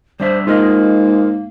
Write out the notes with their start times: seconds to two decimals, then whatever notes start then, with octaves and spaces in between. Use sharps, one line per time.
0.20 G3 D4 C5 E5
0.47 G#2 A#3 F4 A#4 D#5